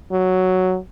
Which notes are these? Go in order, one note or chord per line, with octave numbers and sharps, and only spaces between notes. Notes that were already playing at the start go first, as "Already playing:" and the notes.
F#3